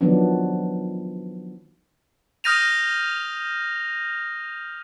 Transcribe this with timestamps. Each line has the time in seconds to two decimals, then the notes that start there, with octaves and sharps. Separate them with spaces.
0.01 D#3 F3 F#3 B3 D4
2.44 D#6 F6 G6 A#6 D#7 F7